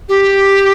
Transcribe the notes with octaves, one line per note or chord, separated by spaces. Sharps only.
G4